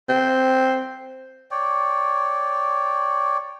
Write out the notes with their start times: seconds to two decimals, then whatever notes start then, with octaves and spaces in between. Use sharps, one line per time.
0.09 C4
1.51 C#5 D5 G5